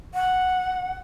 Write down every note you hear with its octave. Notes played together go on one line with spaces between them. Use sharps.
F#5